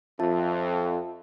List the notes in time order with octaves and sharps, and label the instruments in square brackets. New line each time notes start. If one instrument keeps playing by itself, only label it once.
[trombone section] F2 [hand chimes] F4 E5 A5